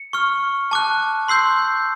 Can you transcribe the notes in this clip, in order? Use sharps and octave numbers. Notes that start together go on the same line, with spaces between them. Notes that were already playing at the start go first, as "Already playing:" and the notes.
Already playing: C#7
C#6 F6
A5 D6 F#6
C6 E6 G6 C7